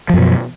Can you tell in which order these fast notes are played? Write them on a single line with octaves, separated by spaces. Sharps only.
F3 F#2 B2